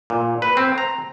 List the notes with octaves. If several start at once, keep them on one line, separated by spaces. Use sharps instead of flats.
A#2
B4
C4
A#5